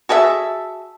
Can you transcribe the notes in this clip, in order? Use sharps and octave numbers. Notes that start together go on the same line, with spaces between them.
F#4 G#4 A4 E5